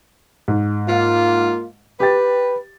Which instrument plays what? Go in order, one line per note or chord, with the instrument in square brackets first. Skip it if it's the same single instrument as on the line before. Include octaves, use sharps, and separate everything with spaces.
[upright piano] G#2
[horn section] A#3 F4
[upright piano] G4 G5 A6 [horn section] B4